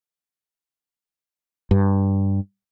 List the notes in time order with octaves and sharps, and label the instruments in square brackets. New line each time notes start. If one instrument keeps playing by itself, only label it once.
[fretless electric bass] G2